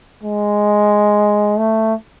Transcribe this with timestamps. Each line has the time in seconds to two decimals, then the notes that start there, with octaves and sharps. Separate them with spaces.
0.24 G#3
1.58 A3